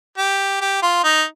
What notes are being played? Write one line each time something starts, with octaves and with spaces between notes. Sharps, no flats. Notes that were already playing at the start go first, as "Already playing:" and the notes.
G4
G4
F4
D#4